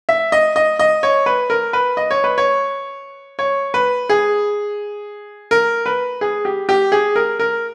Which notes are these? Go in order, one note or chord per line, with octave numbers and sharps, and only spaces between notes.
E5
D#5
D#5
D#5
C#5
B4
A#4
B4
D#5
C#5
B4
C#5
C#5
B4
G#4
A#4
B4
G#4
G4
G4
G#4
A#4
A#4